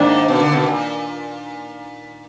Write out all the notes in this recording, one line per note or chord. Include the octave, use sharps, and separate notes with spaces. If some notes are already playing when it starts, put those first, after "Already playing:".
Already playing: G#2 D#3 A#3 D4
B2
D3
B2
A#2